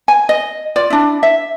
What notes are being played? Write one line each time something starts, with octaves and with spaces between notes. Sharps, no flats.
G#5
D#5
F4 D5
D4 E4
E5